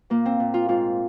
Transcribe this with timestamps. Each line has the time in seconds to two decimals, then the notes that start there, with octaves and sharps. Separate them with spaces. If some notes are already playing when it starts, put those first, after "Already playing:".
0.10 A#2 A#3
0.26 C4
0.40 A#2
0.54 F4
0.68 G#2 F4